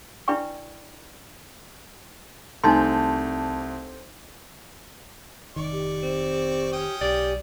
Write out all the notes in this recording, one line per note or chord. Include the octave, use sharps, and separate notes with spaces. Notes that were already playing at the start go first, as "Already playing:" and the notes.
D4 E4 B4 D5 G5 C#6
C2 A3 C4 D4 D#4 A5 C6 G6
F1 D#3 D5 C#6
G4
C4
C#4 G5 D#6
B1 G4 D5